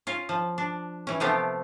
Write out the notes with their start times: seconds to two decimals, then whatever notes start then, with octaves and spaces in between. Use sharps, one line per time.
0.07 C#4 F4
0.29 F3
0.58 D4
1.07 E3 C#4
1.20 C3 F3 A3 B3 C4 G4